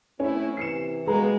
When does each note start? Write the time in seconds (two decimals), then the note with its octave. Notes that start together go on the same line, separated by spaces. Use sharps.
0.20 A2 C4 C#4 E4
0.57 C3 E3 C7 C#7 E7
1.07 B2 G#3 A#3 G#4 B4 A#5